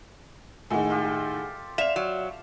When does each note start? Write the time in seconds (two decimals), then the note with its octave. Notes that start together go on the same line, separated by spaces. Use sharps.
0.71 A2 D#3 G#3 G#4 A4 F#5 G#5
0.90 F4 G4
1.78 D5 E5 F5 E7 F7
1.96 F#3 F5